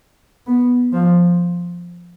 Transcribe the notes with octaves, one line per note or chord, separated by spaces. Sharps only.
B3
F3